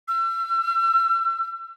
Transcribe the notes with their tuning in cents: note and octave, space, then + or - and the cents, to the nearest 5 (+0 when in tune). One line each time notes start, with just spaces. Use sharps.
E6 +40